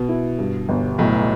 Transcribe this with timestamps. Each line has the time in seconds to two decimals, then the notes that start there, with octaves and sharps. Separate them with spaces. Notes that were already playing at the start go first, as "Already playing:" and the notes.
Already playing: B2 B3
0.09 E4
0.39 G2
0.69 G1
0.98 B1 A2